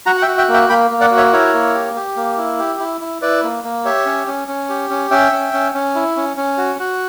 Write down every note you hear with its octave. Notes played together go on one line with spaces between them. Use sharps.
F#4 F#5 A#5
F#5
E5 G5
F#4
E5 G5
A#3
E5 G5
A#3 G5 B5
A#3
D5 F#5
F#4
C#5 E5
E4 A#4 C#5
A#3
G4
G4
A#3
E4
G4
E4
E4
E4 B4 D5
A#3
A#3
G4 C#5 E5
C#4
C#4
C#4
G4
C#4
C#4 E5 G5
C#4
C#4
C#4
E4
C#4
C#4
F#4
F#4